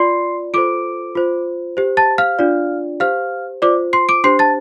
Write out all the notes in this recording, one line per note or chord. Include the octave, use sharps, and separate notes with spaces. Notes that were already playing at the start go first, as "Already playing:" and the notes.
Already playing: F4 D5 C6 C7
F4 A4 C5 D6 D7
F4 C5
G4 C5
A5 A6
F5 F6
D4 F4 D5
G4 C5 F5 F6
F4 C5 D5 D6
C6 C7
D6 D7
D4 G4 C5 C6 C7
A5 A6